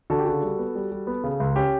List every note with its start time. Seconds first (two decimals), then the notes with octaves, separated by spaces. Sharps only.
0.10 D3 F#4 A4
0.19 G4
0.25 C#3 F#4 A4
0.42 G3
0.58 B3
0.75 G3
0.92 G3
1.07 B3
1.24 C#3
1.40 C#2
1.56 C#4 G4